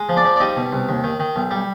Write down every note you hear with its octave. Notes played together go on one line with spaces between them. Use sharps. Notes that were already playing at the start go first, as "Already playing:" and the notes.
Already playing: G#3
F3
D4 D5
F3
D5
G3 D#4 D#5
B2
C2
D#2
D#3
D#3
B1
G3